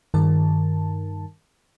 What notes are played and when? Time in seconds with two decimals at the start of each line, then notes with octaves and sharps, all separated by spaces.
0.14 G2 D#3 A#4 A5